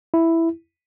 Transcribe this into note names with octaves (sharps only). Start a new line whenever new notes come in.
E4